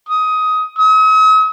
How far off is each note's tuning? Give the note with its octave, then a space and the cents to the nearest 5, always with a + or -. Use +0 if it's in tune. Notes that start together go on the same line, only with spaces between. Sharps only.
D#6 +15
D#6 +45